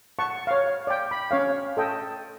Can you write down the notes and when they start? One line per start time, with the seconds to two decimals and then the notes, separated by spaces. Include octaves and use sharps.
0.19 F#5 A5 C#6
0.47 C#5 F5
0.87 D5 G5
1.11 B5
1.31 C#4 C#5 F5
1.77 A4 D#5 G5